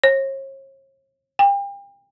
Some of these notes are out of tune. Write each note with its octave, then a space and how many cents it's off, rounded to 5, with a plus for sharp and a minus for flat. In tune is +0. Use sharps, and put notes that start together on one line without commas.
C#5 -40
G5 +35